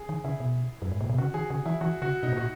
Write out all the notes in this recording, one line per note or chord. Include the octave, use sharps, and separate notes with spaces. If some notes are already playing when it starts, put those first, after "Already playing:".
Already playing: G#4
D#3
C#3 E4
B2
F#2
G#2
A#2
B2
C#3 F#4
D#3 G#4
C#3 G#4
E3 E4
E3 F#4
C#3 F#4
B2 D#4
A#2 F#4